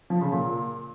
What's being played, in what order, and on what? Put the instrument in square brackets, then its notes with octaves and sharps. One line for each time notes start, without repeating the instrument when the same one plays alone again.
[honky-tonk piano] F3
C#3
A#2